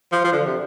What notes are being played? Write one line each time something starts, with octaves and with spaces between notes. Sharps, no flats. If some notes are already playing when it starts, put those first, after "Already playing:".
F3
F3
D3
C3